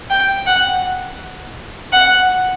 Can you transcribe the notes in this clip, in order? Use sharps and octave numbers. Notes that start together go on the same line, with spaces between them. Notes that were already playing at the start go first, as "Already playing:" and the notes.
G5
F#5
F#5